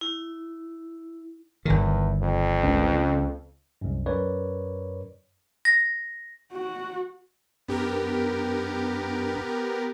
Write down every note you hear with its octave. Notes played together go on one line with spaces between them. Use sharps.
E4
G1 E2 D#3
F2
C#2
C2 F#2
F#2 A#4 B4 C#5 D5
A#6
F#4
F#2 B3 D4 G4 A#4